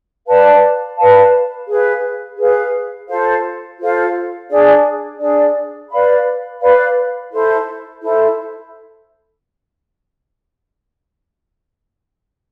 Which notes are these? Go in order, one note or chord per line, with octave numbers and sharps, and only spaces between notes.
B4 D5 F5 A5
B4 D5 F5 A5
G#4 B4 F5
G#4 B4 F5
F4 A4 C5 F5
F4 A4 C5 F5
D4 G#4 D5
D4 G#4 D5
B4 D5 F5 B5
B4 D5 F5 B5
E4 A4 C5
E4 A4 C5